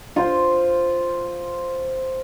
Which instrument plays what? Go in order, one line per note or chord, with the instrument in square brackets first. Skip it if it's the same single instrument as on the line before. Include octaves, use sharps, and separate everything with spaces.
[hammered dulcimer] F4 C5